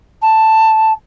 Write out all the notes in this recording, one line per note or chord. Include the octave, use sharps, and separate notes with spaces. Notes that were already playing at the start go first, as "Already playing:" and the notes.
A5